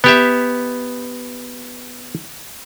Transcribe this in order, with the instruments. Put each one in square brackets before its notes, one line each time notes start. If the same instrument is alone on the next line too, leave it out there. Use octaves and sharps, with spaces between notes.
[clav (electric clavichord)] B3 G4 E5